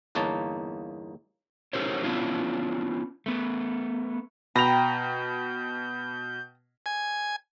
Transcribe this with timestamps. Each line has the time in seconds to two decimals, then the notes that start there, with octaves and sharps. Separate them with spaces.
0.15 G1 E2 A#3 D#4 C#5 A5
1.73 C#4 E4 G4 A#4 C5 C#5
2.03 B3 C#4 D4 E4 F4
3.26 A3 B3
4.56 B2 G5 A#5 B5 G6 F7
6.86 G#5